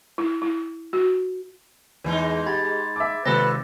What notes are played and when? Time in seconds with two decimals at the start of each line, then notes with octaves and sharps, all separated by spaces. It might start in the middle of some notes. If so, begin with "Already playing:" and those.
0.18 E4
0.42 E4
0.93 F#4
2.04 E2 G#2 G#3 D#4
2.46 G4 B5 G#6 A6
2.96 E5 D6
3.25 G#1 C3 F4 A4 B4 A#6